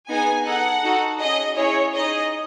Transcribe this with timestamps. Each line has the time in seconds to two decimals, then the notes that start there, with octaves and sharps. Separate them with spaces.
0.08 B3 D#4 G#4 G#5
0.45 D#4 A4 F#5
0.83 D#4 F#4 A4
1.19 C#4 G#4 D#5
1.56 C#4 E4 G#4 C#5
1.94 D#4 G#4 D#5